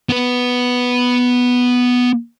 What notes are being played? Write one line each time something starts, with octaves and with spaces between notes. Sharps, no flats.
B3 B4